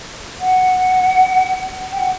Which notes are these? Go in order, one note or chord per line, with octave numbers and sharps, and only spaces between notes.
F#5
G5
F#5